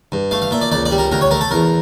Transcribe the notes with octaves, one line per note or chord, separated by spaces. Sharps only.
G2
A3 F5
F5
A#2 E5
D5
C#2 D5
D5
G3
A#4
D2 A#4
C#5
A3 A#4
A4
E2 A#4